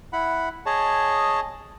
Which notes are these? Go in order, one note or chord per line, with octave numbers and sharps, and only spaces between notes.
E4 F#5 B5
G#4 C#5 D#5 A5